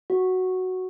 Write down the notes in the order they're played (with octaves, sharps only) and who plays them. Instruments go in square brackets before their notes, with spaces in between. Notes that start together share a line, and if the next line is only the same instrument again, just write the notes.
[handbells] F#4